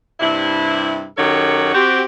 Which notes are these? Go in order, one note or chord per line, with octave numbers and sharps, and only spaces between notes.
G2 C3 D4 E4
F#2 D#3 G4 A4 C#5 F#5
C4 F#4 G4